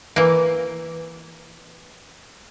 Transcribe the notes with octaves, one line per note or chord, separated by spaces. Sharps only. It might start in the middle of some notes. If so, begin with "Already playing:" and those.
E3 A#3